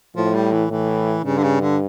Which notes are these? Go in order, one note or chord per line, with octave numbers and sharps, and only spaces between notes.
A2 F3
G3
E3
A2 E3
G2 C#3
D3
C#3
D3